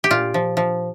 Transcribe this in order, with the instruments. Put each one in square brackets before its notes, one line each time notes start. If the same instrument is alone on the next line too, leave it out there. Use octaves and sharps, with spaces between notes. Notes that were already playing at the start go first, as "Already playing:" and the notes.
[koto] G4
A#2 F4
F3
F3